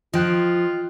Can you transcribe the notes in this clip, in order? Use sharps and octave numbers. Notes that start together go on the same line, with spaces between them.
F3 F4 D#5 G5 F#6